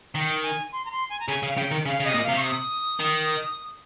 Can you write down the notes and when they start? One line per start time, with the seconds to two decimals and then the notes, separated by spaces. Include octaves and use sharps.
0.15 D#3 G5
0.43 G#5
0.72 C6
0.85 A#5
0.91 C6
1.10 G#5
1.20 A#5
1.28 C#3 G#5
1.43 C#3
1.49 F5
1.57 C#3 G5
1.71 D#3
1.86 C#3 F5
2.00 C#3
2.05 C3 D#5
2.14 A#2
2.24 C3 F5
2.36 C#6
2.43 D#6
3.00 D#3